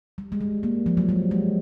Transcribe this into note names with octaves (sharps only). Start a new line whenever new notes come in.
G3
G#3
G3
A#3
F3
F#3
G3
G#3